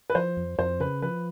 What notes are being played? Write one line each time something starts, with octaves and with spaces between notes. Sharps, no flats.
B4
F3 C5
F2
F2 C5
C#3 B4
F3 B4